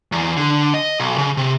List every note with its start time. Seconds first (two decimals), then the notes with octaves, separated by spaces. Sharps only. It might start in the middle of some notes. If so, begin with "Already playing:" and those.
0.12 E2
0.37 D3
0.74 D#5
1.00 B1
1.18 C#3
1.37 C3